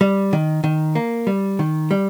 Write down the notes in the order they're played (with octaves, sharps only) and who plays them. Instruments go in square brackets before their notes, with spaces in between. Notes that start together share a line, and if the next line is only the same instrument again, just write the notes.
[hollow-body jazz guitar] G3
D#3
D#3
A#3
G3
D#3
G3